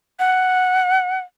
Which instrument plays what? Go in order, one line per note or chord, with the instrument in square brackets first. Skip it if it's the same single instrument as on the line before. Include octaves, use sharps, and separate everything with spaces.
[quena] F#5